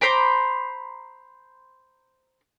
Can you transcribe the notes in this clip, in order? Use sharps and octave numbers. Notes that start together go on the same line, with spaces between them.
C5 A#5 B5 D6